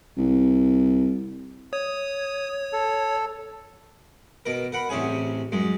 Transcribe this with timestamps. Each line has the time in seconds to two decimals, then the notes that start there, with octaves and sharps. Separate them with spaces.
0.17 C2
1.73 C#5 D#6
2.73 A4
4.46 B2 A#4
4.72 A#4 F#5 B5
4.89 A1 C3 C#4 G#4 G#5
5.52 F#2 G#3